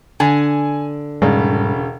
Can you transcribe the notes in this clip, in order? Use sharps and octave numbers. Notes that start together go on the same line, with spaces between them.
D3 G#5
E1 G#2 C#3 G3 G#3